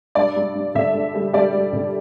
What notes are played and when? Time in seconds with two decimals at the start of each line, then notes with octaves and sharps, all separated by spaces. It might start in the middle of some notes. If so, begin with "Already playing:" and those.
0.15 G2 D5
0.36 G2
0.55 G2
0.75 D3 E5
0.94 G2
1.14 G3
1.33 G3 D5
1.53 G3
1.73 D3